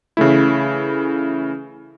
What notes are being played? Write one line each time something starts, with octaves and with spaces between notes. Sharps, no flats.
C#3 E3 A3 E4